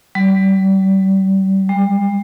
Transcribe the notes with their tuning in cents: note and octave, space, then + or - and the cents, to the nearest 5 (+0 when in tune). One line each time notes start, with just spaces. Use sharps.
G3 -35
G3 +40